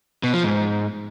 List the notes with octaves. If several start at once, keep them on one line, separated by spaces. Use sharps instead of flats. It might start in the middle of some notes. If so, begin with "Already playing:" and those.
B2
F3
G#2